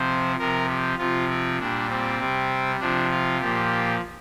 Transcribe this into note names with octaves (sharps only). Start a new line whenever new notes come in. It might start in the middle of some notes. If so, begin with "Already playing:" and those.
Already playing: C3 F3 C5
C3 F3 A#4
G4
C3 F3 F4
C4
A#2 G3 D4
C4
C3 G3
C3 F3 D4
F4
A#2 F3 G4